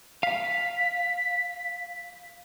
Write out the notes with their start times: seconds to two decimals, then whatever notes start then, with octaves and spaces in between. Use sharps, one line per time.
0.23 F5 B6